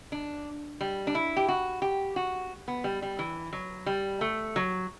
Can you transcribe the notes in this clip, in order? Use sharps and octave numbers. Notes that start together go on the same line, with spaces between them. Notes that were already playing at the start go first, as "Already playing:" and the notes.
D4
G3
D4
E4
G4
F#4
G4
F#4
B3
G3
G3
E3
F#3
G3
A3
F#3